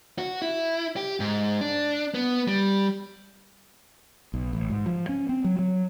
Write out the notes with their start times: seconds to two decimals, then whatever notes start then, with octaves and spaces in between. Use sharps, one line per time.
0.18 F#4
0.42 E4
0.97 G4
1.20 G#2
1.61 D4
2.14 B3
2.48 G3
4.34 B1
4.53 A1
4.70 G#2
4.86 F3
5.09 C#4
5.29 C4
5.44 F#3
5.59 F#3